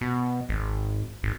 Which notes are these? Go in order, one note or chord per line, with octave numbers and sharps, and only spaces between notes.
B2
G#1
G#1